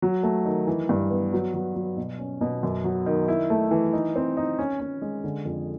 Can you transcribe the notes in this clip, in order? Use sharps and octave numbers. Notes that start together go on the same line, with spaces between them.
F#3
A3
D#3
E3
G2
B3
F#3
F#3
F#3
B2
C#4
B2
F#2
F#3
D#3
E4
A3
E3
D#4
C4
D#4
C#4
C#4
G#3
D3
F2